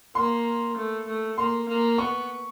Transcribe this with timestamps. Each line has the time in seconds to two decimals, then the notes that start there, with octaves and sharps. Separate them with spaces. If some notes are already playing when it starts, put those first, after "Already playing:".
0.15 A#3 C6
0.77 A3
1.07 A3
1.38 A#3 C6
1.68 A#3
1.98 B3 C#6